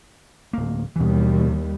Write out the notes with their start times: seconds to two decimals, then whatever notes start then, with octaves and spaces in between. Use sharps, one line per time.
0.53 D1 A#3
0.96 D#2 B2 E3 G3